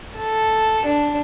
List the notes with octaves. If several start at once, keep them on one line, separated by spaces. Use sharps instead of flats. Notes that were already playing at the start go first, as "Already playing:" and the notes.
A4
D4